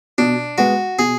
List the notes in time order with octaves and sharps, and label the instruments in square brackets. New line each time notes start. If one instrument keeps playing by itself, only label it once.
[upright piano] B2 [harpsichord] D4
[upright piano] G#3 B3 [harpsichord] F#4
[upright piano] B2 [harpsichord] G#4